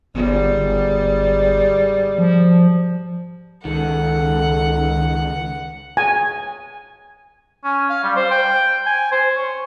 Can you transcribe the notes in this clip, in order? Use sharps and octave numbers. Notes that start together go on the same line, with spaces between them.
G1 G#2 G3
G1
F3
C#2 D#3 A4 F#5
G#5
C#4
F5
G3
C5
G5
G#5
C5
C#5